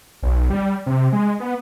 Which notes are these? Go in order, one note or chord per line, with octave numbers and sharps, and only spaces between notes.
B1
G3
C3
G#3
B3